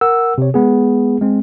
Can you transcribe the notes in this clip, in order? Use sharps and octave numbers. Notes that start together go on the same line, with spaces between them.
A#4 F#5 E6
C3 C#5
G#3 B3 G#4
G#3 C4